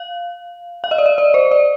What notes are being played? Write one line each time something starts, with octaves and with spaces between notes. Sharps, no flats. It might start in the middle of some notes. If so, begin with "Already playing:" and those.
Already playing: F5
F5
D#5
D5
D#5
D5
C5
D5